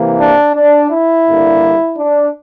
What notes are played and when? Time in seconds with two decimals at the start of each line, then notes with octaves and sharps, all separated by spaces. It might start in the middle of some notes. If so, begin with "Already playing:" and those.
Already playing: C3 E3 A#3
0.20 D4
0.55 D4
0.91 E4
1.26 G2 D3 G3 A#3
1.97 D4